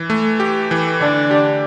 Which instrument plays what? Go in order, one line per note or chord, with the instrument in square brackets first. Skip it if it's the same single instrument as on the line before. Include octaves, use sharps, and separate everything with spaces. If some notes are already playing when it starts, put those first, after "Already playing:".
Already playing: [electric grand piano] E3
A3
G4
E3
[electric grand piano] D3 [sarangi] D4
[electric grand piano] G4